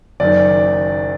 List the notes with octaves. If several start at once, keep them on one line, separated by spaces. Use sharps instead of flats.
F#1 F#2 D#3 D5